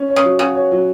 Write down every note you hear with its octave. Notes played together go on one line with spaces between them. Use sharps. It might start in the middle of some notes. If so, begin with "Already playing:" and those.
Already playing: C#4
C#5
C#3
F#3
C#3 F#4
C#5
F#3